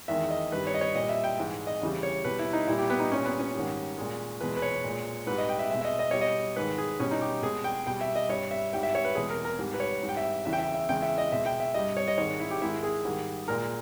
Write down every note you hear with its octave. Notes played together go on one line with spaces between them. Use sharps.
E2 D#3 G#3 E5
D#5
G2 D#3 G3 B4
C#5
D#5
C#5
A#2 G3 D#5
E5
G5
G#2 E3 G#3
D#5
E2 C#3 E3 G3
C#5
B2 G3 B4
E4
D#4
A#2 G3 E4
G4
B3
D#4
A#2 G3 C#4
B3
C#4
G#2 D#3 G3
A#2 G#3
E2 B2 G#3 B4
B4
C#5
A#2 G#3
G#2 G3 B4
D#5
G5
E5
B2 G#3 E5
E5
D#5
D#5
B2 G3 C#5
D#5
G#2 D#3 G#3 B4
G#4
B2 G3 C#4
D#4
G4
B2 G#3 G#4
G5
B2 G3 G5
E5
D#5
G2 G3 C#5
E5
G#2 G3 G5
E5
C#5
B4
E2 B2 G#3 G#4
A#4
A#4
G#2 G3
B4
C#5
G#2 G3
G5
E5
E2 C#3 E3 E5
G5
E5
E5
E2 C#3 G#3 G5
E5
D#5
B2 G#3 E5
G5
E5
G2 G3 D#5
C#5
D#5
G#2 D#3 G#3 C#5
E4
G4
G#2 D#3 G#3 E4
G#4
G#2 D#3 G3
A#2 G#3 A#4